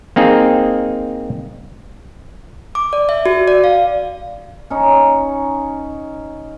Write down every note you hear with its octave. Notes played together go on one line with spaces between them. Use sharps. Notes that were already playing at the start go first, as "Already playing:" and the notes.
A#3 C4 D#4 G#4
D6
D5
E5
F#4
D5
F5
C#4 D#4